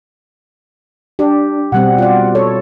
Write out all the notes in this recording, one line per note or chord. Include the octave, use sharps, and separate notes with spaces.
D4 G4
B2 G3 C4 F#5
F4 D5
A4 C#5